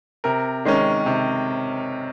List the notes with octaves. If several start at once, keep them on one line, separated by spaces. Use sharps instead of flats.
C3 A#4
D#3 G#3 C#4
C3